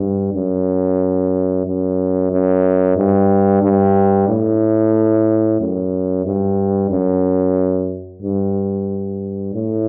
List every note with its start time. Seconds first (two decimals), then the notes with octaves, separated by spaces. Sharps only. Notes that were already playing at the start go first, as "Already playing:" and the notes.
Already playing: G2
0.34 F#2
1.65 F#2
2.31 F#2
2.97 G2
3.62 G2
4.28 A2
5.60 F#2
6.25 G2
6.91 F#2
8.23 G2
9.54 A2